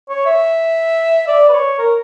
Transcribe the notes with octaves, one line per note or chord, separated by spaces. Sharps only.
C#5
E5
D5
B4
C#5
A#4